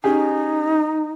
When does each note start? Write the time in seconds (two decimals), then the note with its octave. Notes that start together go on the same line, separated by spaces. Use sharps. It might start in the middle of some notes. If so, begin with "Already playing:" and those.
0.04 C#4 D#4 G4 G#4